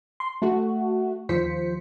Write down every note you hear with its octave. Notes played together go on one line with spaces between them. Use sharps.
C6
A3 F#4
D#2 F3 C5 B6 C#7